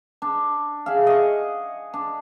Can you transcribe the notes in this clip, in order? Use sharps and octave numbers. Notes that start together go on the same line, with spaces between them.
D4
G#4 E5 F5
D#5 F#5 C#6
D4